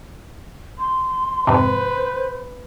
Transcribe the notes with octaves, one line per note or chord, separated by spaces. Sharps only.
C6
F2 G#2 C3 B4 C5